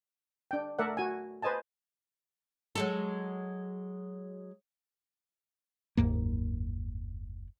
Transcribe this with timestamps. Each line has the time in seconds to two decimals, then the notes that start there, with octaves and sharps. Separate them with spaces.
0.51 D4 G5
0.79 A3 A4 A#4 D5 E5 F#5
0.97 F#4 G#5
1.42 B4 C5 D#5 G#5 A5
2.75 F#3 G#3 A4
5.97 F#1 D#2 G#2 A#3